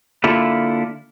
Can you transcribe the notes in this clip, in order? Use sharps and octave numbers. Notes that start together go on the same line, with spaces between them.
D3 A#3 E4 F4 A4